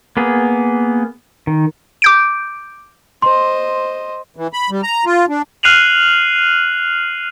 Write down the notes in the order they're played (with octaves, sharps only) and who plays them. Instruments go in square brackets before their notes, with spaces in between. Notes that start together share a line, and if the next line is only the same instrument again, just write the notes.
[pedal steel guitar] A#3 B3 G#4
D#3
[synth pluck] D6 G6 D7
[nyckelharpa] C5 D#5 [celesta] C6
[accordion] E3
B5
G3
A#5
F4
D4
[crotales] F6 F#6 C7 D#7 F7 F#7